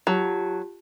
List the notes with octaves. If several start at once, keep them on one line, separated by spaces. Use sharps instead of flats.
F#3 F4 G4 A5